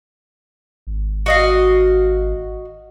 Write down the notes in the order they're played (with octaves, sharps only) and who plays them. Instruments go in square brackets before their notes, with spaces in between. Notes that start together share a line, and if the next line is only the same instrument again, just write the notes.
[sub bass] G#1
[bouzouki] F#4 D#5 F5